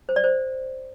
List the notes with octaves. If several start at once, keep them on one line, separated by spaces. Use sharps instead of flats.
C5
D5
C5